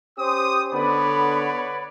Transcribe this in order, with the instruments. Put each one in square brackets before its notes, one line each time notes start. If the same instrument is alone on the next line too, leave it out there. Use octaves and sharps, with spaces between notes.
[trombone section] C#4 G4 C5 [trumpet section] D#6
[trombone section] D3 B3 [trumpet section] B4 C#5 D5 [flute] B5